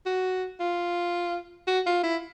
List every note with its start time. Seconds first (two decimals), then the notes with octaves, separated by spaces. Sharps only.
0.06 F#4
0.60 F4
1.67 F#4
1.86 F4
2.03 E4